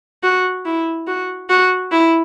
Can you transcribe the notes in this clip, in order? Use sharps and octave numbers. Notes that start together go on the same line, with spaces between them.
F#4
E4
F#4
F#4
E4